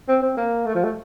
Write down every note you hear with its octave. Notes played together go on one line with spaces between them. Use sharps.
C4
C4
A#3
A3
F3
A3